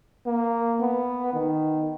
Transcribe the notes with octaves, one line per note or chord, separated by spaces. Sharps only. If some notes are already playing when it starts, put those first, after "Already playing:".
A#3
B3
D#3